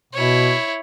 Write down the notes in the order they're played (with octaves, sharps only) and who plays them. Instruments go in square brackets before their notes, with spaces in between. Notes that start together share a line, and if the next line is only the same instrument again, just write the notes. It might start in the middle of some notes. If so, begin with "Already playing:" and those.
[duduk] B2 [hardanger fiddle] E4 C#5